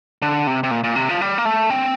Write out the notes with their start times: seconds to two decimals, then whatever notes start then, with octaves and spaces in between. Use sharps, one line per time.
0.22 D3
0.47 C3
0.63 C3
0.71 A#2
0.84 A#2
0.96 C3
1.09 F3
1.21 G3
1.38 A#3
1.45 A3
1.70 C4